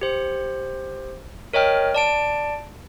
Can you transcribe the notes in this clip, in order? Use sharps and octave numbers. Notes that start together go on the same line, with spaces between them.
G4 C5
A#4 C#5 D#5 G5 F6
D5 A5 D7